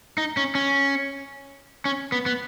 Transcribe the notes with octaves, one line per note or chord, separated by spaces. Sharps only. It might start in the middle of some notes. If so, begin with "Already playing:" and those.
D#4
C#4
C#4
C#4
B3
B3